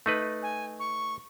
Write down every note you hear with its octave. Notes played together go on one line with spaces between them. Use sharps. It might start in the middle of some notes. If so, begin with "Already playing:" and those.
A3 D#4 B4
G#5
C#6